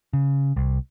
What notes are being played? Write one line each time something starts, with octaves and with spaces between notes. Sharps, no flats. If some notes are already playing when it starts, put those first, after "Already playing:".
C#3
C2